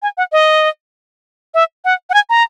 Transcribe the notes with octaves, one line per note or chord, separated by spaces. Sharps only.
G#5
F#5
D#5
E5
F#5
F#5
G#5
A#5